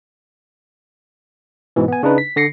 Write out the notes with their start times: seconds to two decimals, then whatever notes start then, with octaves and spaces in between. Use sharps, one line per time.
1.76 G#2 B2 E3
1.88 B3 G#5
2.03 C#3 D4 D#4 B4
2.18 B6
2.36 D3 A#6 C7 C#7